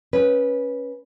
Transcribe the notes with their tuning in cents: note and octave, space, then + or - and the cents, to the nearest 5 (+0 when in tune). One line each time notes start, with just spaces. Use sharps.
C#4 +0 B4 -15